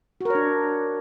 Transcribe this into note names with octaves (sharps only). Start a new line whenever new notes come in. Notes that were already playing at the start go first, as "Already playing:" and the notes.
D4 F#4 A#4 C#5